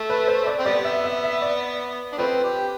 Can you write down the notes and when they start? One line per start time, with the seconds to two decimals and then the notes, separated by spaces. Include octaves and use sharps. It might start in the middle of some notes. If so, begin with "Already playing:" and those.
Already playing: A3
0.10 B4
0.28 C5
0.47 D5
0.59 C4
0.66 G3 B3 D5
0.85 E5
1.04 E5
1.24 E5
1.42 D5
2.12 D4
2.18 F3 A3 C4 B4
2.44 G4